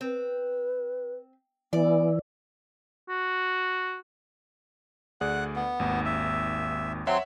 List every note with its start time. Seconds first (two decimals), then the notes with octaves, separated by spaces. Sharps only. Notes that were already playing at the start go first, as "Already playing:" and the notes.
0.01 C4 B4
1.73 E3 B3 D5
3.09 F#4
5.21 D2 G#4 D5 F#5
5.56 B3
5.79 G#1 D#2
6.06 E5
7.07 F#3 C4 C#5 E5 F#5 C6